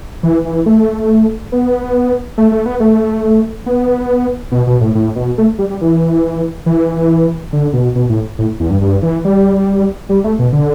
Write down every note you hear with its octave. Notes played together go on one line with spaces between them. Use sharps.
E3
E3
A3
B3
A3
A3
B3
A3
B3
B2
B2
A2
A2
B2
A3
G3
G3
E3
E3
D3
B2
B2
A2
A2
E2
G2
G2
E3
G3
G3
A3
B2
D3